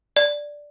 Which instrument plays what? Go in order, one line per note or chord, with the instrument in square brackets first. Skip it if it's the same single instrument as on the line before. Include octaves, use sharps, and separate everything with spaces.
[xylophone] D5